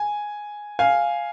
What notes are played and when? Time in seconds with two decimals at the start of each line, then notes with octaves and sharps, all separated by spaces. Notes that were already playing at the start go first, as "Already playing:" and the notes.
Already playing: G#5
0.79 F5 G#5